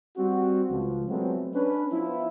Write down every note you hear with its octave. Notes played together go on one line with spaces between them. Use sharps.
G3 C4 F#4
C#2 F3
F#3 G#3 A3 B3 C4
C#4 D4 B4
F3 B3 E4